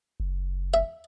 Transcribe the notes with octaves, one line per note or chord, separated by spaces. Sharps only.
F#1
E5